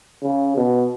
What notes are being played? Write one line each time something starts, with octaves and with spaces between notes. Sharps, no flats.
C#3
B2